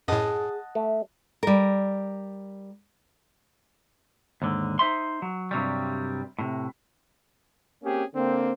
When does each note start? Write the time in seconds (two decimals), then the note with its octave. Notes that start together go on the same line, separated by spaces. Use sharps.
0.08 F#2 A2 G#4 D#5 F#5 A5
0.75 A3 E5
1.43 G3 A#4
4.42 D#2 G#2 D3
4.79 D#4 C5 E5 C6
5.22 F#3
5.51 G2 C3 F#3 G3
6.39 A2 C3
7.83 A#3 C4 C#4 G4 G#4
8.14 D3 A#3 C4